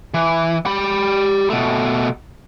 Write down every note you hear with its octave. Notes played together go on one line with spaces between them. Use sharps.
E3
G4 B5
B2 A3